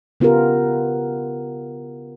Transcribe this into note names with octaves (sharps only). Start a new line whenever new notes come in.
C#3 B3 F4 G4 A#4